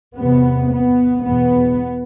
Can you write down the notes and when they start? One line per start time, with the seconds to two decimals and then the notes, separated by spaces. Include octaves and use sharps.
0.16 E2 C3 B3
0.71 B3
1.24 E2 B2 B3